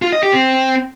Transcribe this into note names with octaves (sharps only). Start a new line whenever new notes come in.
F4
D#5
G4
C4